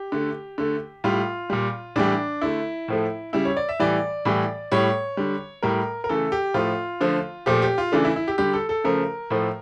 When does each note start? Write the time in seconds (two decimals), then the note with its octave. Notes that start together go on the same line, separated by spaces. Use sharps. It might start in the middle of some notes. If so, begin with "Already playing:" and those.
Already playing: G4
0.12 D3 A3
0.58 D3 A3
1.04 A2 G3 F4
1.50 A#2 G3
1.96 A2 E3 G3 D4
2.42 D3 A3 E4
2.88 A2 F3 A3
3.33 C#3 G3 E4
3.45 C#5
3.57 D5
3.69 E5
3.80 A2 E3 G3 D5
4.25 A2 E3 G3
4.72 A2 G3 C#5
5.17 D3 G3
5.63 A2 G3 A#4
6.04 A#4
6.09 C#3 E3 A3 A4
6.32 G4
6.54 A2 F3 A3 F4
7.01 D3 F3 A3
7.46 A#2 F3 A3 G4
7.62 G4
7.78 F4
7.92 C#3 E3 A3 D4
8.05 E4
8.16 E4
8.28 G4
8.38 D3 G3 G4
8.53 A4
8.69 A4
8.84 C#3 F3 A3 A#4
9.31 A2 F3 A3